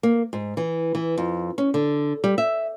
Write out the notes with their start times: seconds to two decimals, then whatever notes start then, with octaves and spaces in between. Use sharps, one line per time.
0.03 A#3
0.33 G#2
0.57 E3
0.95 E3
1.18 F2
1.58 C#4
1.74 D3
2.24 G3
2.38 E5